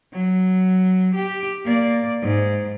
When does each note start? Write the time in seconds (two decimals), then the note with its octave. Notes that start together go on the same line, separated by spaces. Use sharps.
0.13 F#3
1.15 G4
1.65 A#3 D5
2.22 G#2